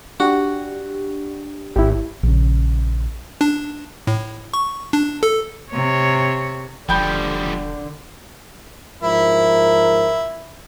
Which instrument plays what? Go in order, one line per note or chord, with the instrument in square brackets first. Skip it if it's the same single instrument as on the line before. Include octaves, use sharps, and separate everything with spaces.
[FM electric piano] D4 G4 [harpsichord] F#4
[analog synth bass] G#1 [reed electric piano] E4 G4
[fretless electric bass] A#1 C#3
[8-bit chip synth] D4
A2
C#6
D4
A4
[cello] C3 C#5
[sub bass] E1 [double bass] D3 [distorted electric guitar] F3 G3 [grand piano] G5 B5 G6
[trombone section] G#2 F3 A#4 [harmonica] E4